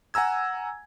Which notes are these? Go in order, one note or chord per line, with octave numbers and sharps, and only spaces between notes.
F#5 G#5 A#5 E6 G#6